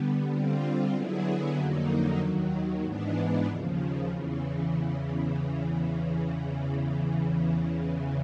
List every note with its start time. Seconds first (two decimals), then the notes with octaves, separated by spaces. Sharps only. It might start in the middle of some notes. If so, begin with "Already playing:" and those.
Already playing: D3 G3 B3
0.28 D3 G3 C4 F4
0.92 D3 F#3 B3 E4 G#4
1.55 F2 D3 F#3 A#3 D#4
2.19 D#2 D#3 F#3
2.82 G#2 E3 G#3 B3 D4
3.46 D#2 C#3 F3
4.09 E2 C#3 E3